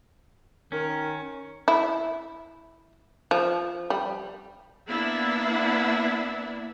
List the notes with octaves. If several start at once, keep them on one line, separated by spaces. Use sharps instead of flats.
D#3 C#4 A#4
E4
F3
G3
A#3 B3 D4 E4 E5